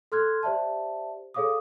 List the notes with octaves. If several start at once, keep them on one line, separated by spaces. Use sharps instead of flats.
A4 C6 F6 F#6 G#6
G4 C5 D5 E5 A5
G#4 A4 C#5 F5 D6 D#6